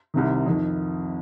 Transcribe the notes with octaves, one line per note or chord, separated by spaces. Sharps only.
C2 C3 D#3
F2 D#3